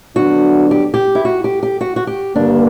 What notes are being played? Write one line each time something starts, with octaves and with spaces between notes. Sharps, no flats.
D3 F#3 B3 D4 F#4
G4
G4
E4
F#4
G4
G4
F#4
F#4
G4
G2 D3 A#3 D4